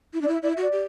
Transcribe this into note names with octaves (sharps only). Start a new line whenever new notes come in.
E4
D4 D5
E4 E5
E4 D5
E5
F#4 D5
G4